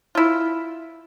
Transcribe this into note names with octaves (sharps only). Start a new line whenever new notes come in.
E4 F4